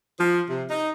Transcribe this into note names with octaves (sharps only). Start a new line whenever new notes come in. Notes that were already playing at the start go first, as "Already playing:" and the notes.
F3
C3
D#4